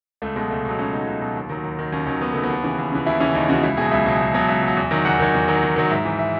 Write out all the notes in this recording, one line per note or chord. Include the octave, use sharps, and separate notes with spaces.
C#2 A3
B2 F#3 G#3
C#2 A3
B2 F#3
C#2 C#4
B2 F#3 D#4
C#2
B2 F#3
D#2
D#3 F#3
D#2
D#3 F#3
D#2 C#4
D#3 F#3 C#4
D#2 B3
D#3 F#3 A3
B3
D#2
C#3 E3
D#2
C#3 E3
D#2 E4
C#3 E3 C#4
D#2 D#4
C#3 E3 F#4
C#2 E4
B2 F#3 G#4
C#2 E5
B2 F#3
C#2
B2 F#3
C#2 E5
B2 F#3
E2
D#3 F#3
E2 F#5
D#3 F#3
E2
D#3 F#3
E2
D#3 F#3
G#2 E5
E3
E5